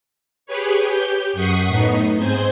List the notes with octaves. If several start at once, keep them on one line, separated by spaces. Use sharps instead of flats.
G4 G#4 B4 C#5
G4 G6
F#2 F#5 C#6 D#6 B6 C7
A2 B3 D#4
G#2 C4 G#4 C5 G6 G#6